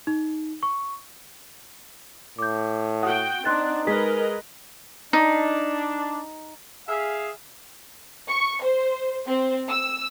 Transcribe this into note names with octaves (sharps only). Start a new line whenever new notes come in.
D#4
C#6
A2 D6 G6
F#4 F#5 G5 D#6
C4 D4 D#4 C6 F#6 A6
G#3 G#4 A#4 B4 D#5 B6
D4 D#4
G#4 E5 F5
C#6
C5
C4
E6